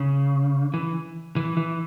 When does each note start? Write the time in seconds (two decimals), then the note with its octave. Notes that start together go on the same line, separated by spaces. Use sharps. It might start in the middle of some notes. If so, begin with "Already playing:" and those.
Already playing: C#3
0.74 E3
1.36 E3
1.57 E3